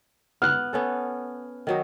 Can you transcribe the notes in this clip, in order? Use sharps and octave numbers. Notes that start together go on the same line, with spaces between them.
B3 F6 F#6
B3 C#4 A4
D#3 F#3 D#4